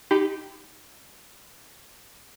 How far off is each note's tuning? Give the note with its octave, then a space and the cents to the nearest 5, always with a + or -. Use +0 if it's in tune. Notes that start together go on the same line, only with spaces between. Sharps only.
D#4 +0 G4 +0 B5 +30